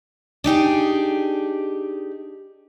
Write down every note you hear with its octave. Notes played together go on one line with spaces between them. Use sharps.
D4 D#4 G4 G#4